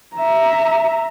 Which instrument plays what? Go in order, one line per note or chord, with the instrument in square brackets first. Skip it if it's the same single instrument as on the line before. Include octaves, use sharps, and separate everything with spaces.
[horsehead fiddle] E5 A#5